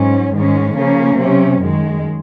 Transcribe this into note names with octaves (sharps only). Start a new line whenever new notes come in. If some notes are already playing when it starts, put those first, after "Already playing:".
Already playing: G#2 F#3 C#4
G#2 D#3 G#3 C#4
C#3 F3 A#3 C#4
C3 F#3 C#4
F#2 D#3 G#3